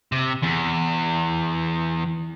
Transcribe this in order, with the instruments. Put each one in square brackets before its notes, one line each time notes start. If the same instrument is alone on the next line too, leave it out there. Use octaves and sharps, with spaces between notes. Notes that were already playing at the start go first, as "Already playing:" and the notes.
[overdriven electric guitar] C3
E2